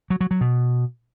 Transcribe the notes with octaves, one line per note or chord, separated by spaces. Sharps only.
F#3
F#3
F#3
B2